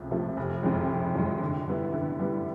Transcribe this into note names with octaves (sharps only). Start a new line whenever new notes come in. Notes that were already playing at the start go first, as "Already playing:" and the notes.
Already playing: C#2 C3 F3 A3
C3 F3 A3
F1
F2 C3 D#3 G#3
F1
F2 C3 D#3 G#3
D3
G3 B3 E4
D3
G3 B3 E4